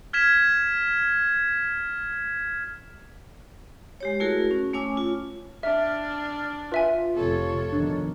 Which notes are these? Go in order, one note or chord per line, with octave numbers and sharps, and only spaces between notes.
F6 G#6 B6 E7
G#3 G4 C#5
A3 E4 F#4 G#4 A#4
C#4
A3 C#4 C#5 G#5 D6 E6
F4
D4 E5 F6
F4 B4 E5 G#5
F1 C3 A4 C#5
B2 D#3 F3 D4